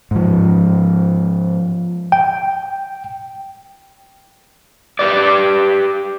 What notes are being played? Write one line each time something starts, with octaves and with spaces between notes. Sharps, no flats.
G#2 F3
G5
G4 B4 D5